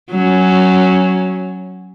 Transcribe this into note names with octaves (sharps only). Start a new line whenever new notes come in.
F#3 C#4